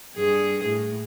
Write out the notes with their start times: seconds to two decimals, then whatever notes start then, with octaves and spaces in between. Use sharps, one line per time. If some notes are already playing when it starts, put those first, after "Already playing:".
0.16 G2 G#4
0.64 A2